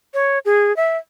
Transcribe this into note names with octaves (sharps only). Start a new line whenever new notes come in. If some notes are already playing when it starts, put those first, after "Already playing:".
C#5
G#4
E5